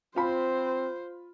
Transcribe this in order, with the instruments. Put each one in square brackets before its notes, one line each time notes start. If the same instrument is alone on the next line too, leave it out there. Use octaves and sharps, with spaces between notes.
[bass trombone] C4 [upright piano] F4 B5 [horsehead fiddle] C5